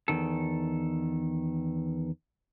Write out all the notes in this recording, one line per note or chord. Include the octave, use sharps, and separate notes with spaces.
E2 A2 D#3 A4